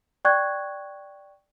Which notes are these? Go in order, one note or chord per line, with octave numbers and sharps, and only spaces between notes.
D5 G5 C#6 F#6 G#6